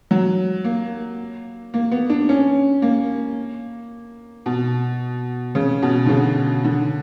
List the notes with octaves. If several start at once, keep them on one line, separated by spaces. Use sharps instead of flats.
F#3
A#3
A#3
B3
D4
C#4
A#3
B2
C#3
B2
D3
C#3
D3